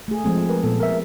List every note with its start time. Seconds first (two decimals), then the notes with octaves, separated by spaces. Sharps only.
0.08 A3 G#4
0.24 F3 G#3 C4
0.49 A#4 B4
0.63 A#2 B3 A4
0.80 A#4 E5